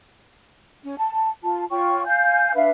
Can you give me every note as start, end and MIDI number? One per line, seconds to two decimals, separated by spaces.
0.83 0.94 61
0.99 1.29 81
1.43 1.64 65
1.43 1.64 81
1.70 2.04 65
1.70 2.04 73
1.70 2.04 79
1.70 2.04 85
2.06 2.54 77
2.06 2.54 80
2.06 2.54 91
2.55 2.70 62
2.55 2.70 71
2.55 2.70 76
2.55 2.70 77